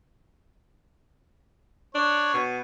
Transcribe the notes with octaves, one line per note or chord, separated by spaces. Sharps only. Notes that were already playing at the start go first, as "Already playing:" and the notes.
D4 C#5
B2